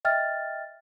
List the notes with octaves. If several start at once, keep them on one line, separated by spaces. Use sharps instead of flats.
D#5 E5 G5 F6 A6